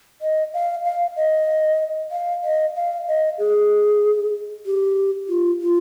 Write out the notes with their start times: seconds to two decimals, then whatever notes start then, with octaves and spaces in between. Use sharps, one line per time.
0.22 D#5
0.54 F5
0.85 F5
1.16 D#5
2.12 F5
2.44 D#5
2.76 F5
3.07 D#5
3.39 G#4
4.66 G4
5.29 F4
5.62 F4